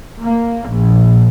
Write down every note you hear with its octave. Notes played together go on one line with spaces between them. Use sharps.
A#3
A#1